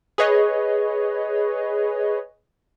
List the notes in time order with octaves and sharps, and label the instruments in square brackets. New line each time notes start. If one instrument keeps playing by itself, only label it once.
[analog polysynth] G#4 B4 C#5 D#5